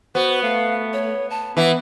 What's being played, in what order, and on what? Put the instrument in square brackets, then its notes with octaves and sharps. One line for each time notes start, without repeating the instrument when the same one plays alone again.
[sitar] B3 [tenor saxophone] F#4 [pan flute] C5
[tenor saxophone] A3 [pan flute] F5
[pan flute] C#5
A5
[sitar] E3 [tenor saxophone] B3 [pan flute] E5